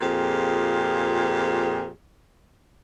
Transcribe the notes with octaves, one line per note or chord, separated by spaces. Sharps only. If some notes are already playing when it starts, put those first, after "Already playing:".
F2 A#2 G4 G#4